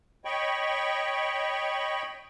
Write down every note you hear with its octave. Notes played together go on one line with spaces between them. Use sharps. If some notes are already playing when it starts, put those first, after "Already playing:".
C#5 D#5 G5 B5 C#6